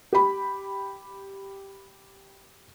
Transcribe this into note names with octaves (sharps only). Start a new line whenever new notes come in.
G4 B5